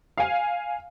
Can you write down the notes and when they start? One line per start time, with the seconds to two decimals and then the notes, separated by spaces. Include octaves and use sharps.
0.18 F5 G#5